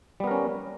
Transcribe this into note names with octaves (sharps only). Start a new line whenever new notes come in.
G3 B3 C#4 A#4